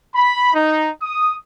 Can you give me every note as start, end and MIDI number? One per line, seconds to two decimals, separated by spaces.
0.15 0.52 83
0.53 0.88 63
1.02 1.34 87